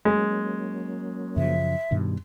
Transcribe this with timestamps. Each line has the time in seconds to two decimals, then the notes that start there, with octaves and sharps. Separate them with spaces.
0.05 F#3 G#3 A#3 C#4
1.36 F#2 C#3 F3 E5
1.91 G2 B2 D#3